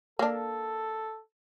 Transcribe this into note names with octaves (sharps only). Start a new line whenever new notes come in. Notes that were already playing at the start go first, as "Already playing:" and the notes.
A#3 D4 A4